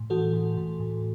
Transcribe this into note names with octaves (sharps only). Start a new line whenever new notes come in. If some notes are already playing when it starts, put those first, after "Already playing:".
Already playing: A2
E3 F#4 A4
A2
A2
A2